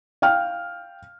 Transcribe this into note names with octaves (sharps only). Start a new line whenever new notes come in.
F5 G5 F6